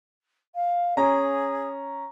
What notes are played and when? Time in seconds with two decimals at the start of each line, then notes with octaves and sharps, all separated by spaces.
0.55 F5
0.97 C#4 G#4 A#5